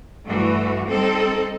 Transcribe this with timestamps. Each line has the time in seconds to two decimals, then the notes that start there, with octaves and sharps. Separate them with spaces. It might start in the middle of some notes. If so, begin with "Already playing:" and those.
0.25 G2 E3 A3 F#4
0.86 G3 C4 D#4 A4